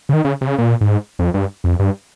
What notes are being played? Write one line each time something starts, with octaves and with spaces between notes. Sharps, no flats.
C#3
D#3
C#3
C3
C#3
A#2
G#2
F2
G2
F2
G2